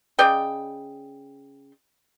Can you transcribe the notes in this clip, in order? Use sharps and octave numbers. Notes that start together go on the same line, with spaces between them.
C#3 D5 D#5 G5